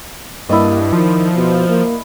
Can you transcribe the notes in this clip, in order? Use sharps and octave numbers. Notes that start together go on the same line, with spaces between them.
G2 A#3 E4 D5 D#5
D#3 F3
B2
A#3